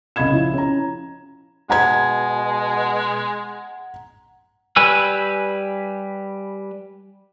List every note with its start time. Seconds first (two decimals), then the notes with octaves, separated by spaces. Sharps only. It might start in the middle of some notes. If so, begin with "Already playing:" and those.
0.16 C2 C#3 D#5 B5 G#6 E7
0.33 F3 E4
0.54 C#4 A#5
1.70 B2 G#3 F#5 A#5 G#6
4.76 G3 B4 G#5 E6